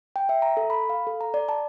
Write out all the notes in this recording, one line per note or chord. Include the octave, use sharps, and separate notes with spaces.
G5
E5
A#5
A4
B5
F5
A4
A#5
D5
A5